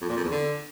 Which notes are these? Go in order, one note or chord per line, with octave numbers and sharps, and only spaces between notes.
F2
A#2
F2
E2
D3